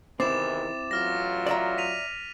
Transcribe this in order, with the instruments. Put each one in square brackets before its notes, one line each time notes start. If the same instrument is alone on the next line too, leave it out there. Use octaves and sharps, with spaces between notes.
[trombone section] E2 C3 D#3 [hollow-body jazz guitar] C4 E4 [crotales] D6 A6 E7
[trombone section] A1 F#3 F4 [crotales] D6 F6 A#6
[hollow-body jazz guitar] D5 E5 A#5
[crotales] B6 D#7 F7